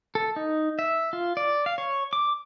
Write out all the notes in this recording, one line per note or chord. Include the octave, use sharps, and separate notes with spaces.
A4
D#4
E5
F4
D5
F5
C#5
D6